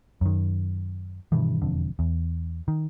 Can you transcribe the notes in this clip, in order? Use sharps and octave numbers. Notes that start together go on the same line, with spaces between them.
F#2 D#3
G2 B2 D#3 E3
E1 F2 D3
E2
D#3